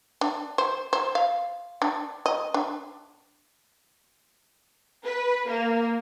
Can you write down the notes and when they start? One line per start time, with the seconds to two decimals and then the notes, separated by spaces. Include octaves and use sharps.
0.21 D4
0.58 C5
0.93 C5
1.15 F5
1.82 D4
2.26 D#5
2.54 D4
5.05 B4
5.48 A#3